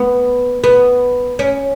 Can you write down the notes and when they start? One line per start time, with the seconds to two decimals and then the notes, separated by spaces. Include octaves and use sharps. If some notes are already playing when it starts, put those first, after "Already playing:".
Already playing: B3
0.64 B3
1.39 C#4